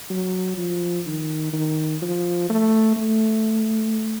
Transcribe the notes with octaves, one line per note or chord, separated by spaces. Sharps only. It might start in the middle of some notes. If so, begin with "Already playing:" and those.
F#3
F3
D#3
D#3
F3
A3
A3